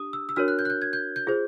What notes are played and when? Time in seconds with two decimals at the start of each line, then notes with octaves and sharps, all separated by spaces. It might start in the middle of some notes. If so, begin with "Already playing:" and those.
Already playing: D4 G4 D#6
0.13 E6
0.29 E6
0.36 D4 F#4 A#4 C#5 F6
0.48 F#6
0.59 G6
0.65 F#6
0.70 G6
0.82 G#6
0.93 G6
1.16 G6
1.27 F4 G#4 C5